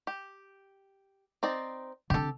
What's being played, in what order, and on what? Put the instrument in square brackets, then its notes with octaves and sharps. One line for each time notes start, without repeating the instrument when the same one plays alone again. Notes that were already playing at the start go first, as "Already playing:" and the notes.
[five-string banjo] G4
C4 D#4 D5
[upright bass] D3 C4 [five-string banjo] G4 A4